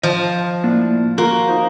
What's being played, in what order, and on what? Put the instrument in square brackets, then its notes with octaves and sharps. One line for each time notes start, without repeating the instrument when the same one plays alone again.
[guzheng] F3 [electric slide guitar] D#5 A5
[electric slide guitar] A2 A#3 D4
[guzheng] A#3 [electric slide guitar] F4 F#4
[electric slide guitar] D#4 C5